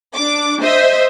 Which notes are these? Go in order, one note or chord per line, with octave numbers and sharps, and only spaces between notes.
D4 D6
C5 D#5 E5